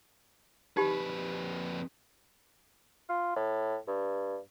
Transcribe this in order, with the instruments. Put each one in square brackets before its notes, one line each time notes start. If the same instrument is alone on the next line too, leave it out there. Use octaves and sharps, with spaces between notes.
[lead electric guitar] F2 B4 [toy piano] D#4 G4 B5
[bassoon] F4
A2
G2